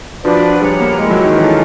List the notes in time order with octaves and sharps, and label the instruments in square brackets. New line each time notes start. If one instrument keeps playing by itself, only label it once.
[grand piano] F3 [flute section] D4 F#4 B4 D5
[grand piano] G3 [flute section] G#4 C#5 F#5 A#5
[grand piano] A#3
[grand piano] G#3 [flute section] E4 G4 A#4
[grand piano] F#3
D#3
[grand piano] E3 [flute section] C#4 F4 A4